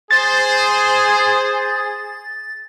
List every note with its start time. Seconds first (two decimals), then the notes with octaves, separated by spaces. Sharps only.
0.11 G#4 C5 A6